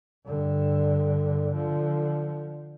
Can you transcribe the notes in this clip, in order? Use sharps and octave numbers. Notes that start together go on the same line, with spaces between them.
G2 D3
D3 F3